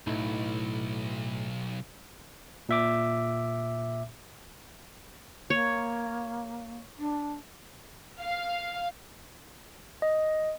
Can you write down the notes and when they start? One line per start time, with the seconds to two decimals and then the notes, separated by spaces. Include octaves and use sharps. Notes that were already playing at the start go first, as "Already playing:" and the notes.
0.07 B1 A2 D#4 E4
2.69 A#2 E5 D6
5.50 A#3 C#5
6.99 D4
8.20 F5
10.02 D#5